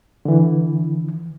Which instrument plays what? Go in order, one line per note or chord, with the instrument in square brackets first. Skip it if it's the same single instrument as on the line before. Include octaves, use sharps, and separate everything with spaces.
[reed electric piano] D3 E3